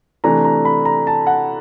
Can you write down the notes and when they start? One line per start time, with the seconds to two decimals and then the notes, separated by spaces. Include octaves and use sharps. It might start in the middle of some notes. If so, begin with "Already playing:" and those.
0.24 C3 E3 A3 D4 A#5
0.44 A#5
0.65 B5
0.85 A#5
1.07 A5
1.27 F#5